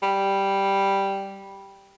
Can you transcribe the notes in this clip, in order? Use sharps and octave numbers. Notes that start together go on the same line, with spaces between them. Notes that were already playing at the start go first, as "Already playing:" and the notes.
G3